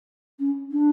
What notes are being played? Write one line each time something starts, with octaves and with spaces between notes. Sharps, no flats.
C#4
D4